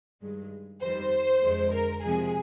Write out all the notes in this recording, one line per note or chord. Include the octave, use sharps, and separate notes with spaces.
G2 D#3 G#3
F2 D#3 G3 C5
F2 D3 G#3
A#4
C3 F3 G#3 G#4